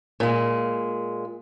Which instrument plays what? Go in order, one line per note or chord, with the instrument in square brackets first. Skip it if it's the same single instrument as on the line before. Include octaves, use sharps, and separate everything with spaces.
[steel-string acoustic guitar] A#2 G#3